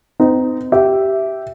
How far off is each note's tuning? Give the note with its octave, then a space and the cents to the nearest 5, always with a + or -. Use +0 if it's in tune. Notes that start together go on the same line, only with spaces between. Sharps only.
C4 -35 D#4 +0
G4 -15 E5 +0